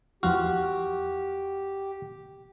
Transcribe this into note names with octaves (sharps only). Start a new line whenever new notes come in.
E2 F3 F#4 G4 F6